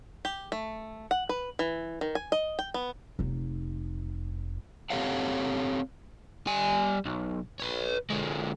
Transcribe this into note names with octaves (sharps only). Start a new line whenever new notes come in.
G4
A3
F#5
B4
E3
D#3
G#5
D#5
G5
B3
F1 D#4
C4 G4 A4 C#5 F5 F#5
G3 G#5
B1
B4 C#5
D3 G#3